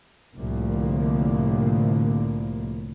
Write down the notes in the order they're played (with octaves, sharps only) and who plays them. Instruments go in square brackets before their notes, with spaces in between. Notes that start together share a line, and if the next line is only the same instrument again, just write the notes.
[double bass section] C2 A2 D3 F3 A#3